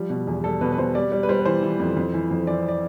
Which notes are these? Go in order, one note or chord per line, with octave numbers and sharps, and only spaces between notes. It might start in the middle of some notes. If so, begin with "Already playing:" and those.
Already playing: F3 G3
B2
E2
G3 A4
B2 B4
B4
B2 C5
G3 D5
G3
B4
G3 C5
B4
E3 C5
E3
F2
F2
E3
F2
E3 D5
D5